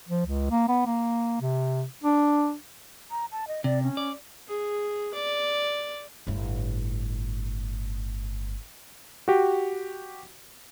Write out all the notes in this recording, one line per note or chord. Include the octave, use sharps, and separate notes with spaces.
F3
C#2
A#3
B3
A#3
C3
D4
A#5
A5
D#5
C3 D5
C#4
D5
G#4
D5
G1 A2
F#4 G4